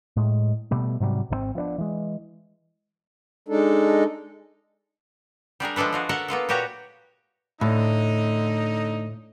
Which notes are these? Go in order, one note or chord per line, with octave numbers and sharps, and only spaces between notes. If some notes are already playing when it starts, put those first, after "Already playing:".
A2 G#3
B2 G3 A3
G#2 C3 F#3 G3
G#1 C#3 C4
F3 B3 C#4 D4
E3 G#3
G#3 D4 D#4 A4
G3 D4 G#4 A#4
F3 G#3 D4 A4 B4
G#3 F4 F#4
A4 A#4 E5 F#5 A5
A#3 B3 F4 A4
A#2 F#4 G4 B4 C#5 A#5
A2 D3 A3 D#4